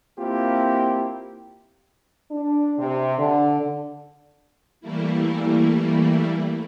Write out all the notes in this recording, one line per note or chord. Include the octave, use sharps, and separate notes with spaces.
A#3 C4 E4 F4 G4
D4
C3
D3
E3 G3 A3 A#3 E4